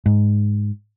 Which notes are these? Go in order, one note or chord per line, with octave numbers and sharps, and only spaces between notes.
G#2